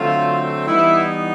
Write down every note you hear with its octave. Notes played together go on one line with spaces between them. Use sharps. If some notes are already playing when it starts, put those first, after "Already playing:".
Already playing: D3 F#3 A3 C4 F4
E3 G3 B3 D#4 E4